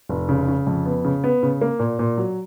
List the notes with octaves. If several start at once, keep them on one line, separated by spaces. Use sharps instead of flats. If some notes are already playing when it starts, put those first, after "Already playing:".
F1
C#3
C#3
F2
B3
C#3
B3
C#3
A#3
A#2
A#2
F#3